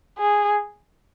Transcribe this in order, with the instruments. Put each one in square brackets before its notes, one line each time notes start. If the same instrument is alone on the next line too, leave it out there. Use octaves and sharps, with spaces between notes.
[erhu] G#4